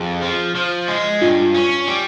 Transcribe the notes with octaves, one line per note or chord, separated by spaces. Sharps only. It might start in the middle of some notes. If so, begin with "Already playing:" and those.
Already playing: F2 G#4
F3
F3
G#3
G2 F4
C#4
G3